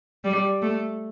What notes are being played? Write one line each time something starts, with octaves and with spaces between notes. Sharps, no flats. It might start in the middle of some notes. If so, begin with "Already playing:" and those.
G3
A3